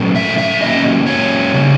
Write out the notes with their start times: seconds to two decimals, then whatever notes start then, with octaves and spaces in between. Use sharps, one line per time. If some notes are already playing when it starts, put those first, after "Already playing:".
Already playing: A#2 F#3 A3 C#4
0.16 E5
0.38 E5
0.61 A#2 F#3 A#3 C#4 D#5
1.06 C#5
1.54 C#3 G3